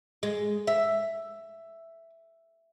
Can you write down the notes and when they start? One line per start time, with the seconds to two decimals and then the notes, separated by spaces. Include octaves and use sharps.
0.23 G#3
0.67 E5